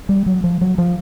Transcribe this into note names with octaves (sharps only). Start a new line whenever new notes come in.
G3
F#3
F3
F#3
F3